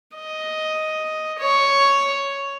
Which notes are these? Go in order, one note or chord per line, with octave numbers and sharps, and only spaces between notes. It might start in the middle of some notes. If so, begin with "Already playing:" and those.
D#5
C#5